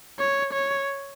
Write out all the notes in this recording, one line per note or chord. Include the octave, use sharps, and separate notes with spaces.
C#5
C#5